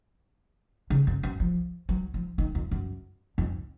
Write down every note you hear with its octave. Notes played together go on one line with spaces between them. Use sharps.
C#3
F#2
F#2
F3
F#3
F3
D#3
F2
F#2
F2